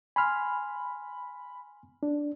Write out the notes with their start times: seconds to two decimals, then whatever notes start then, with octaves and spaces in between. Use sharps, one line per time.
0.16 G#5 B5 C6 F6
2.03 D4